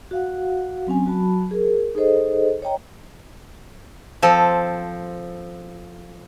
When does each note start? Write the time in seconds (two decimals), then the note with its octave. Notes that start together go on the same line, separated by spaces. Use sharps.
0.11 F#4 F5 F#5
0.87 F#3 C4 C#4 G#5
1.06 F#3 F#4 A5 B5
1.51 G#4 A#4
1.95 D#4 G#4 A4 C5 D#5
2.62 C#5 D#5 G5 A#5
4.22 F3 C4 A4